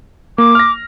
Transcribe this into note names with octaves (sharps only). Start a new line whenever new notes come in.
A#3 D6
F6 A#6